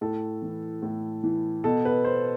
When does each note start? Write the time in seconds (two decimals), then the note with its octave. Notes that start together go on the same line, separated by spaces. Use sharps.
0.01 A2 A4
0.42 E3
0.82 A2
1.24 E3
1.64 B2 A4
1.85 B4
2.05 C5